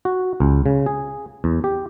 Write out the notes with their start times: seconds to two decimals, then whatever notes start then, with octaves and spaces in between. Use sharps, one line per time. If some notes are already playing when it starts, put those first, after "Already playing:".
0.05 F#4
0.40 C#2
0.66 C#3
0.86 G#4
1.44 E2
1.64 G4